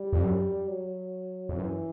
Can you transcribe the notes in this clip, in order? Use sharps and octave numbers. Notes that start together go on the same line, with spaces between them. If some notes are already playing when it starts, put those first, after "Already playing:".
Already playing: G3
F2
F#2
F#3
F2
F#2 E3